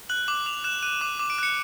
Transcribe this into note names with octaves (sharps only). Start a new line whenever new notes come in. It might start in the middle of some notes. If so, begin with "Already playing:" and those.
F#6 F#7
D6 F#7
D6 F7
F#6 E7
F#6 D#7
D6
D6
D7
F#6 C#7